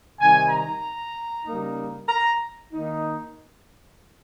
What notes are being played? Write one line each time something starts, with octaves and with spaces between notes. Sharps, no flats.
C3 D#3 G3 G#5
A#5
C#3 G3 A#3 D#4
A#5
D#3 A#3 D#4